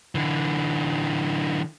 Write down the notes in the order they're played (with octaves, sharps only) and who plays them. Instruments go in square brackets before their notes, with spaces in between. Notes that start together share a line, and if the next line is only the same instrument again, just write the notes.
[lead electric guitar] D3 E3